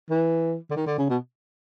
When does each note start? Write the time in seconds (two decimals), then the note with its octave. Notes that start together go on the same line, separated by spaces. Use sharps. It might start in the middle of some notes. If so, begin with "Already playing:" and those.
0.10 E3
0.71 D3
0.76 D#3
0.87 D3
0.98 C#3
1.09 B2